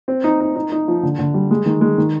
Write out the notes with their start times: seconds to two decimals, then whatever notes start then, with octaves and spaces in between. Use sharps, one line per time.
0.08 C4
0.24 D#4
0.40 D#4
0.56 D#4
0.72 D#4
0.88 F3
1.03 D3
1.19 D3
1.34 G3
1.51 G#3
1.66 D#3
1.81 G#3
1.98 D#3